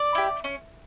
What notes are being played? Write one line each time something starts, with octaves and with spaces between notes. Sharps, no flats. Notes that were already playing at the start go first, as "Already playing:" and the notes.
Already playing: D5
E4 G4
C#4